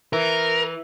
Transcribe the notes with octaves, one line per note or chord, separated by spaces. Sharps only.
E3 A#4